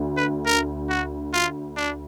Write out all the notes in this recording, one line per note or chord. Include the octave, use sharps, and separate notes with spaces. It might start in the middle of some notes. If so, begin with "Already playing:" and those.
Already playing: D2
B4
A#4
F#4
F4
D4